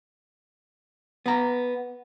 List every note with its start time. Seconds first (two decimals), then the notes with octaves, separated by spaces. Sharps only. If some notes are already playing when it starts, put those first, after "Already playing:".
1.26 B3 A#5